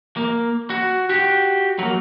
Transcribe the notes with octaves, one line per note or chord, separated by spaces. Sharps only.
A#3
F#4
F#4 G4
F#3 A#3